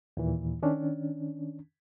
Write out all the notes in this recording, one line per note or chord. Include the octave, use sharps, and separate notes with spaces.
D#2 A#2 E3
D#3 C#4 D4